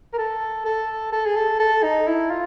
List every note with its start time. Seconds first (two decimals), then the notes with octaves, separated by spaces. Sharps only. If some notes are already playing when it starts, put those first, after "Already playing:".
0.14 A#4
0.18 A4
0.65 A4
1.12 A4
1.26 G#4
1.36 A4
1.60 A4
1.83 D#4
2.07 E4
2.31 F4